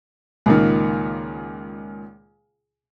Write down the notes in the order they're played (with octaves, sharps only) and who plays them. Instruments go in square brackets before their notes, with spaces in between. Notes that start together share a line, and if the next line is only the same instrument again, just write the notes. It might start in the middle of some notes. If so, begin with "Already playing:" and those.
[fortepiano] C#2 A#2 D#3